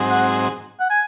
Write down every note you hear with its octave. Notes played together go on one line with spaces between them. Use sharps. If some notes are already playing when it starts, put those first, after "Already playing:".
Already playing: G#2 F#3 C4 D#4 G#4
F#5
F#5
G#5